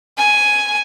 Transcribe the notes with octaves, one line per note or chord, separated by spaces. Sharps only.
G#5